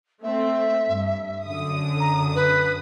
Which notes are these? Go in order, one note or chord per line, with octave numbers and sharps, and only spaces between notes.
A3 C4 E5
G2
F#2 D3 D#6
A#5
B4